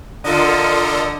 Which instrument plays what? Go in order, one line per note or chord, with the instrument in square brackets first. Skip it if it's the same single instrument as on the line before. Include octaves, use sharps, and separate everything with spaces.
[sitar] D3 [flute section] F4 [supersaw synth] A4 A#4 D#5 [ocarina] D5